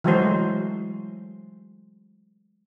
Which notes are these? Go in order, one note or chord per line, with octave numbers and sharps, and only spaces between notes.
E3 F#3 G#3 A3 F#4 C5